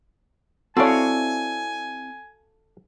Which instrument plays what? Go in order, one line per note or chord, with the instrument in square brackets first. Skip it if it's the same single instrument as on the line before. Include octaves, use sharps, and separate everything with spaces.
[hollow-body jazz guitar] C4 E4 D5 [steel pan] F#4 C#5 [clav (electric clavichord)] A4 F5 [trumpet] G#5